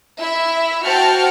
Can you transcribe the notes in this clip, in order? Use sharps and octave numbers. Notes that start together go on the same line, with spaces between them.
E4 E5
F#4 C5 G5 A5 F6 C#7